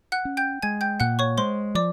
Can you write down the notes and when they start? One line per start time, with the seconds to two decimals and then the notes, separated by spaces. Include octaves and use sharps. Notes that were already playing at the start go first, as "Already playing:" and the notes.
0.12 F#5 F#6
0.25 C#4
0.37 G5 G6
0.62 G#3 G#5 G#6
0.81 G5 G6
1.00 A#2 F#5 F#6
1.19 C#5 C#6
1.37 G#3 C5 C6
1.75 F3 D5 D6